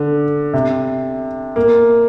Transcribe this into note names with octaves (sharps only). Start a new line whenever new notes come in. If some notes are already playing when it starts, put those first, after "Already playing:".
Already playing: D3
C3
A#3